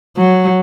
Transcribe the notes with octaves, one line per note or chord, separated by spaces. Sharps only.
F#3